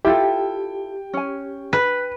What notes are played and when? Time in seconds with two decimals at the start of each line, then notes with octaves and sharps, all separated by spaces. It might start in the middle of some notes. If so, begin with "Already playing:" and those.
0.05 E4 F4 G4 A4 G5
1.14 C#4 G#5
1.73 B4